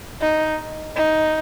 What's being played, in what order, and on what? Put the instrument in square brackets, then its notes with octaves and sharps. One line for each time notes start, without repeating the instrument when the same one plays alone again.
[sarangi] D#4
D#4